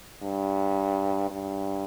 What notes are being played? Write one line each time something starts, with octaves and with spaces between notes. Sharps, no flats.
G2
G2